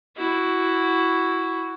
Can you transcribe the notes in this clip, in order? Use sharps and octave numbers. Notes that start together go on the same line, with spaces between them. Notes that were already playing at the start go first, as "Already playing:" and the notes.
E4 F#4